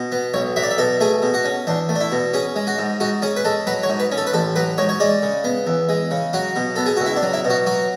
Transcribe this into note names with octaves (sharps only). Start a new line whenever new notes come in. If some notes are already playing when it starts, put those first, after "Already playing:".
Already playing: B2
B3
B1 C#5
F#3 E5
D5
E5
B2 A4
A3 G#4
B2
F#4
C#4
E2 D4
A3
D4
E4
B2
C#4 G#4
G#3
F#4
G#2
G#2 F#4
C#4 G#4
B4
G#3 A4
F#3 B4
C#5
G#2
B4
C#4
A4
B4
A1 A4
F#3 B4
G#2 C#5
C#5
G#3 D5
C#3
B3
E2
G#3
C#3
F#3 F#4
B2
B3 A4
G#4
C#2 F#4
E4
D4
F#3
E4
B2
F#4
F#3 F#4